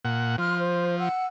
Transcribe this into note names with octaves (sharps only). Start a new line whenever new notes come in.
A#2 F#5
F3 C6 F6 F#6
C5
F#5 E6 F#6